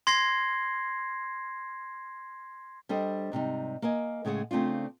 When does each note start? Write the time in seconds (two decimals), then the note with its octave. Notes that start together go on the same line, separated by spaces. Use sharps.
0.07 C6 G#6 A#6 C7
2.89 G3 D4 A4 C5 D#5
3.32 G#2 C3 G3 D#4
3.82 A#3 A#4 D#5 G#5
4.25 A2 C#3 G#3 G#4 F#5
4.51 C#3 A3 C4 D4 F4